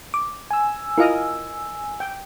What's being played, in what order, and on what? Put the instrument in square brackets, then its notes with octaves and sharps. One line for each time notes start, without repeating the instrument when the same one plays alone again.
[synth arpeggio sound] D6
[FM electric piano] G#5 E6
[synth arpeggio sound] E4 F4 F5 [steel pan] A#4 D#5
[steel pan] G5